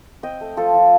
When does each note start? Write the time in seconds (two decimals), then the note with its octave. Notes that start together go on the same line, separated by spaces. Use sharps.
0.23 C4 D#5 G5
0.41 A3
0.57 F3 F4 A4
0.74 F3